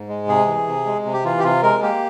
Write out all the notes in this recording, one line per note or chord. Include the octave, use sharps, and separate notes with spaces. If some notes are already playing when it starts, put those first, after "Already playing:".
Already playing: G#2
G#3
C3 G#4
E3
C3
G#3
C3
G4
E3 F4
G4
C3 F4
G#3 A#4
A#3 G4